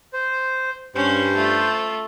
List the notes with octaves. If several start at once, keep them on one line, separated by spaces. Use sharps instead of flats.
C5
G2 C#4 C5
A3 F4